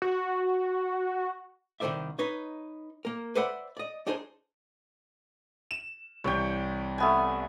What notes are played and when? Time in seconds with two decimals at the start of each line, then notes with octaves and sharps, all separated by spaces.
0.02 F#4
1.80 C2 D#3 B3 C5 D5 E5
2.19 D#4 B4 C#5
3.05 A#3 A#4
3.35 B4 C5 D5 E5 F#5 B5
3.77 D5 D#5
4.07 D4 D#4 G#4 A#4 C5 C#5
5.71 E7
6.24 C2 C3 E3 C#5 G5
6.98 A3 B3 G#5